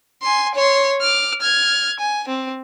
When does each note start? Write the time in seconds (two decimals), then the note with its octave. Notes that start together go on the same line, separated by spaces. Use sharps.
0.22 G#5 C6
0.55 C#5 C6
1.01 D6 F6
1.41 F6 G#6
2.00 G#5
2.28 C4